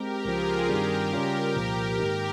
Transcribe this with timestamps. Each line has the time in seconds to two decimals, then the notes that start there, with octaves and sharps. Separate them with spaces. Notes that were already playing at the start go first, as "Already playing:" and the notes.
Already playing: G#3 C4 G4 A#4
0.25 C#2 C#3 F3 F4 G#4
0.68 G2 D#3 G3 C4 G4 A#4
1.13 C#3 G3 C#4 F4
1.56 C2 A#2 F3
1.99 G#2 D#3 A#3 D#4 G4 A#4